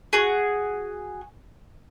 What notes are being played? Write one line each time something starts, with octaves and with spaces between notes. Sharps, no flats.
F#4 G#4